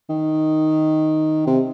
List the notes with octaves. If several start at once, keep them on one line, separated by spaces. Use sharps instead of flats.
D#3
C3